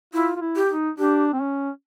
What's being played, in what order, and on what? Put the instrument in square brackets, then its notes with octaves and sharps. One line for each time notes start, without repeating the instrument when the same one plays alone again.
[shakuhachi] E4 [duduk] F4
[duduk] F4
E4
[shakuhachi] G4
[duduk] D#4
[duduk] D4 [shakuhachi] G4
[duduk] C4
C#4